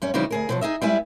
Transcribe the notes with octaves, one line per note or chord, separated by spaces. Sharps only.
F#2 G3 C#4
C#3 E3 F3 G3 D#4 E4
D2 G#4 A#4
B2 F3 F#3
D#4 G#4 D#5 E5
G3 G#3 E4 B4 E5 G#5